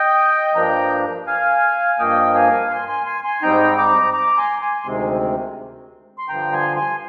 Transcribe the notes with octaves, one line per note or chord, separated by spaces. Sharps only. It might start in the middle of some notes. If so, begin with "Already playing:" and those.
Already playing: D#5 G5
G2 F3 A#3 D4 G5 A#5
F5 G#5
G2 F3 A#3 D#5 G5
F5 G#5
G#5 C6
G#5 C6
G#5 C6
G#5 C6
G#2 G3 C4 D#4 G5 A#5
A#5 D6
A#5 D6
G#5 C6
G#5 C6
D2 C3 D#3 G#3 C4
C6
G2 D3 F3 G5 A#5
G#5 C6
G#5 C6